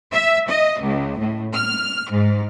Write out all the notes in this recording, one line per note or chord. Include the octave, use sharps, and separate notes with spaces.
E5
D#5
C#2
A2
F6
G#2